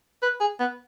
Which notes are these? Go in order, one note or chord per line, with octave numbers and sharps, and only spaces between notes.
B4
G#4
B3